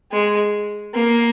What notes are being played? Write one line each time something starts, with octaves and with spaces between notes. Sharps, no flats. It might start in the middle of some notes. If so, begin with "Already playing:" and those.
G#3
A#3